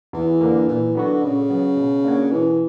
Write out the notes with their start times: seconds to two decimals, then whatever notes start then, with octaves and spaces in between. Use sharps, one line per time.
0.13 E2 E3
0.41 D3 A#3
0.68 A#2 E3
0.95 D3 F#3 B3 F#4
1.22 A#2 C#3
1.50 F#3 B3 F#4
1.77 B2
2.04 A#3 D4 F#4 C#5
2.31 B2 E3